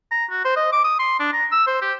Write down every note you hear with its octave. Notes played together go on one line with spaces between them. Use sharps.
A#5
F#4
C5
D#5
D6
D#6
C6
D4
A#5
E6
C5
G4